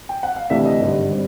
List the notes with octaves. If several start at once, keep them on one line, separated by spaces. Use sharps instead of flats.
G5
F#5
F5
D2 C3 E3 A3 D4 E5
D#5
G#1 G2 D3
G3 C4